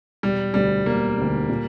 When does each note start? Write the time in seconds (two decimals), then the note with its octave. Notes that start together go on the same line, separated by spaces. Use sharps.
0.23 E1 G3
0.54 D2 D3 G3
0.86 E1 A#3
1.18 D2 D3
1.49 A#2